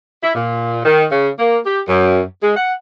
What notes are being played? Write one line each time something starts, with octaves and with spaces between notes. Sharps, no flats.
E4
A#2
D#3
C#3
A#3
G4
F#2
G#3
F#5